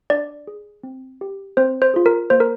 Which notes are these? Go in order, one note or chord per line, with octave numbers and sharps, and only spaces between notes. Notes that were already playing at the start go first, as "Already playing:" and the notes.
D4 D5
G#4
C4
G4
C4 C5
C5
F4 G#4
A#4
A#3 C5
A#4